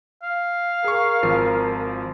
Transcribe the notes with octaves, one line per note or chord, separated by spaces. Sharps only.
F5
G#4 A#4 C#6
G#1 F3 C7